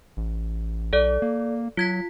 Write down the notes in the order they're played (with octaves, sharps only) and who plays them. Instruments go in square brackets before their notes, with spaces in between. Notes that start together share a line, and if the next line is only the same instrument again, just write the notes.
[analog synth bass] A1
[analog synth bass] B1 [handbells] A4 D5
[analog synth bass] A#3
[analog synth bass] F#3 [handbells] F4 G#6 B6